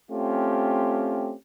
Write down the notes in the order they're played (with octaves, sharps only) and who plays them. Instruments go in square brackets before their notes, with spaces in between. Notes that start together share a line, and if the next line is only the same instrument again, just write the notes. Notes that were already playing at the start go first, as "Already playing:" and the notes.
[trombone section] A3 C4 C#4 F4 G4